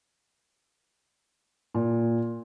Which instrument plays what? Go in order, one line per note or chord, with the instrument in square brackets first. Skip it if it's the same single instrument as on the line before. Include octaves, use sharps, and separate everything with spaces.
[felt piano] A#2